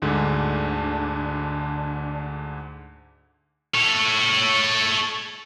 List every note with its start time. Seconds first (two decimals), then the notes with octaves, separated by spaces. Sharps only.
0.02 D2 G#2 D3 D4
3.74 A4 C#5